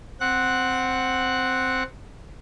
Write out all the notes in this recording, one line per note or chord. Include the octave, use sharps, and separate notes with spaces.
C4 F#5 F#6